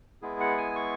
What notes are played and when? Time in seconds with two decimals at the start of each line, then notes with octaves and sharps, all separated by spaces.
0.22 G#3 B3 E4 G#4
0.40 F#5
0.57 G#5
0.76 C#6